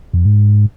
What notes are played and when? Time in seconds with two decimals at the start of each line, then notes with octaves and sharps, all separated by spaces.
0.13 F2
0.25 G#2